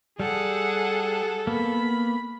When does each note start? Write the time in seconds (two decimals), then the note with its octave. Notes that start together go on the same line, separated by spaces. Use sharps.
0.20 G3 G#4 A4 F#5
1.47 A#3 B3 B5